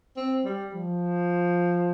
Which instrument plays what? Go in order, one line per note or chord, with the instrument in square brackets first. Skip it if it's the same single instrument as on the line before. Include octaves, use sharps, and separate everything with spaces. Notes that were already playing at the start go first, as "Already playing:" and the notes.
[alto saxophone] C4
G3
F3